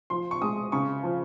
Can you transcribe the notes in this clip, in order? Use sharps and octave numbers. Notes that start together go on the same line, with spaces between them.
F3 C6
C#6
G#3 D#6
C#3 C#6
F3